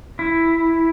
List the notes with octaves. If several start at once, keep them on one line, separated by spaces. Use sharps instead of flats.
E4